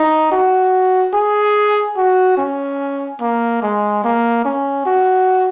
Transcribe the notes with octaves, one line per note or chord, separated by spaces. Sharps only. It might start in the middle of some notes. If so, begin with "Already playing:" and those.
Already playing: D#4
F#4
G#4
F#4
C#4
A#3
G#3
A#3
C#4
F#4